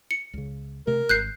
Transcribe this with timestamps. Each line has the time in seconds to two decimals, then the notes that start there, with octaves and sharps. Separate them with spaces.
0.11 C#7
0.33 C#2 C#3
0.87 C3 A3 A#4
1.09 G#1 F#6 G6 C7